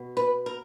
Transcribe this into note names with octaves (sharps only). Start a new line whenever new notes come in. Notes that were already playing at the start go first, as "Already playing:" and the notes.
Already playing: B2
B4
A#4